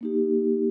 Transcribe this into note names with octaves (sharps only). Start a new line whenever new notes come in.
A#3 D#4 G4